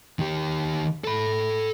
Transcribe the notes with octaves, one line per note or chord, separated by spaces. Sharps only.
D#3 G4
A4 B5